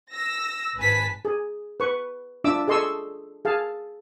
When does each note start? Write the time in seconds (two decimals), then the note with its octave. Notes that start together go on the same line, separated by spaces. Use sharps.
0.12 E6 A#6
0.77 G#1 B4 G#5 A5 B6
1.25 G#4
1.80 B4 C#6
2.44 D4 F4 E5 D6 E6
2.68 G#4 A4 D#5 C6 C#6 E6
3.45 G#4 F5 A5